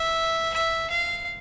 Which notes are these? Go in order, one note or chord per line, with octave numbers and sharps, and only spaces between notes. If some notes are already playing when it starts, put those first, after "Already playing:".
Already playing: E5
E5
F5